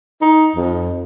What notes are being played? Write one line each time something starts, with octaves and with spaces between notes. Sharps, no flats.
D#4
F2